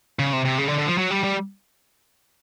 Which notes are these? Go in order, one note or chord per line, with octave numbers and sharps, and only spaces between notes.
C#3
C3
C3
C#3
D3
D3
F3
F#3
G3
G3